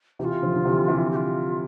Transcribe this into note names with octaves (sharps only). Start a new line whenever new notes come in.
C3 E3 G4
F4
D3 F3
D3
C3 E3
C3 E3
G4
F4